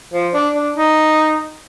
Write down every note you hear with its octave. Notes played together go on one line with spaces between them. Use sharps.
F3
D4
D4
D#4